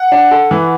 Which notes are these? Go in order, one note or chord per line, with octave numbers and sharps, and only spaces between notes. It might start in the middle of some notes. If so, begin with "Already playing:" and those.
Already playing: F#5
D4
A4
E3